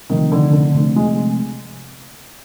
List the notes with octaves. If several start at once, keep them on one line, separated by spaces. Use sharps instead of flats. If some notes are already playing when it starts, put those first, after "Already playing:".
C3 D#3 F3 A3 C4
D3
D3
C3 F3 A3 C4
G#3